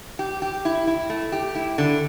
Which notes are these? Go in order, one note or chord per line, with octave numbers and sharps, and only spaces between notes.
G4
G4
E4
E4
A3
G4
E4
D3